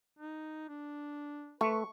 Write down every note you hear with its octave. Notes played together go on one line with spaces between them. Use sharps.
D#4
D4
A3 B4 C#6